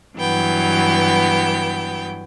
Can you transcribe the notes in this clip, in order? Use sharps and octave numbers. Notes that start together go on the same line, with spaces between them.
G2 E3 F#3 B3 G5